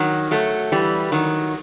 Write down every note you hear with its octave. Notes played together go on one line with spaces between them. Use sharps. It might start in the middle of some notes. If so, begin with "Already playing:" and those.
Already playing: D#3 F#3
F#3 A3
E3 G3
D#3 F#3